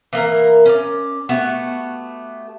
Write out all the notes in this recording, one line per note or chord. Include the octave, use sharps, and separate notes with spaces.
E3 A#3 A#4
C#4 D5
A3 B3 F#4 G4